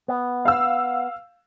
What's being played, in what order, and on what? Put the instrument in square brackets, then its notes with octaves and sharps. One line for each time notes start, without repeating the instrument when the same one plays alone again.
[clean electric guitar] B3
[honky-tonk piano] F5 E6